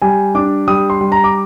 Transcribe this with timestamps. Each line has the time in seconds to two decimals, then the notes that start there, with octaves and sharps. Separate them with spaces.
0.02 G3 G#5
0.35 D4 D6
0.67 G3 D#6
0.90 C6
1.01 G3
1.12 A#5
1.24 D6